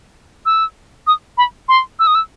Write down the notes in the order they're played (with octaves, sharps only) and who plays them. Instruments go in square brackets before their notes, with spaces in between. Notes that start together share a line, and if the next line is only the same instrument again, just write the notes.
[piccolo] E6
D#6
B5
C6
E6
D#6
E6